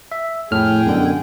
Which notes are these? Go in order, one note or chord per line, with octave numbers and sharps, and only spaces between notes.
E5
F2 A2 G#4 G5 F6
F#2 B2 D3